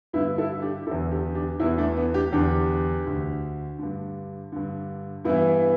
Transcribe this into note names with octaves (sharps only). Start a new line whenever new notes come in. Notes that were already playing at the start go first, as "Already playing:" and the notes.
G2 D3 B3 E4
E4 A4
D4 G4
E2 D3 E4 A4
D4 G4
D4 G4
E2 E3 B3 E4
A3 D4
B3
D4 G4
E2 D3 D4 G4
D2 D3
G2 D3
G2 D3
G2 E3 B3 E4